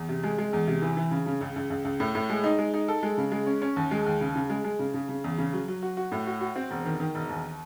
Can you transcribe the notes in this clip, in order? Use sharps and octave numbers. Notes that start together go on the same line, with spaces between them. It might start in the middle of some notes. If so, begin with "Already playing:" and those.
Already playing: E2
C3
G#3
G#3
E2
C3
E3
E3
C#3
C#3
C#2
C#2
C#2
C#2
A2
A2
G#3
D#4
G#3
D#4
A4
G#3
C#3
G#3
C#4
C#4
D#2
G#3
D#2
C#3
C#3
G#3
G#3
C#3
C#3
C#3
E2
C#3
F#3
F#3
F#4
F#4
A2
F#4
F#4
C4
E1
D#3
D#3
E1
D#2